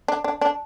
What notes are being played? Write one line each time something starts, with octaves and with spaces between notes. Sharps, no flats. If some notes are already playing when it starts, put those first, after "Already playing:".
D4
D4
D4